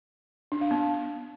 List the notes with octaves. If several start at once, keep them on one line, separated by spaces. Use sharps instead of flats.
D4
F5
B3